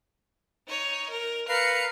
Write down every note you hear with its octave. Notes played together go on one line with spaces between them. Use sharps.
D#4 C#5
A#4
A#4 B4 F5 C7 C#7